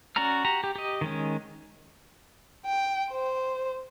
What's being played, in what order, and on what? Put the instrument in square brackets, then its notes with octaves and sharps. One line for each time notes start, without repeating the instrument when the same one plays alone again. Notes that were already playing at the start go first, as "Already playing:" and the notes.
[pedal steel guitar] C#4 F#4 D5 A#5 F6
F#4 G4 A#5
G4
G4 D#5
D#3 G#3 C#4
[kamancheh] G5
C5